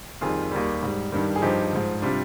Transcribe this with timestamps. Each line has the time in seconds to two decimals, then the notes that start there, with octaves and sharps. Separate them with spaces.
0.21 F2 D#3 G3 F4 G#4
0.52 D#2 D#3 G3
0.83 G#2 G3
1.12 G2 D#3 G3
1.36 G#4
1.42 G2 F3 D#4 G4
1.73 G#2 F3
2.02 C3 G3 D4 F4